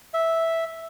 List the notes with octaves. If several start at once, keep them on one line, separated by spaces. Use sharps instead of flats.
E5